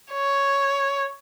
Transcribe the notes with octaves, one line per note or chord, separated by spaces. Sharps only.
C#5